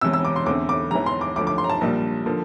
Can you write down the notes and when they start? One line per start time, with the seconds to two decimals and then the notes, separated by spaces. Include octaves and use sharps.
0.01 E1 E2 C3 E6
0.13 E6
0.25 D6
0.36 C6
0.46 E2 D3 A3 C4 D6
0.69 D6
0.91 E1 E2 E3 A#5
1.06 C6
1.21 D6
1.36 D2 D3 F3 D6
1.47 D6
1.58 C6
1.64 A#5
1.70 A5
1.81 A#1 A#2 G3 D4
2.26 D3 F3 A#3